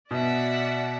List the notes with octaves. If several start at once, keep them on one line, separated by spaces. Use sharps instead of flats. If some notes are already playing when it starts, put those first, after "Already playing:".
B2 D5 E5 F#5